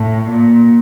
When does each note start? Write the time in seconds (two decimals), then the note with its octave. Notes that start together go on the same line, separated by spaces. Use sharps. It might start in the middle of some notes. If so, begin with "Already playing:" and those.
Already playing: A2
0.30 A#2